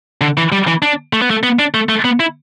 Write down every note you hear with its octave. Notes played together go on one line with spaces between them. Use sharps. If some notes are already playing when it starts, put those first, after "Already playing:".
D3
E3
G3
E3
D4
A3
B3
A3
B3
D4
A3
A3
B3
E4